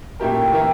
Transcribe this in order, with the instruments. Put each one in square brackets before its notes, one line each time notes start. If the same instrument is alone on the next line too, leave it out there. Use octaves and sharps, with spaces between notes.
[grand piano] A#2 A3 E4 G4 A#4 [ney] G5
[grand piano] E3 A#3 E4 A#4